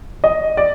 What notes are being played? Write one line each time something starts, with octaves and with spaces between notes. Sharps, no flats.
D#5
D5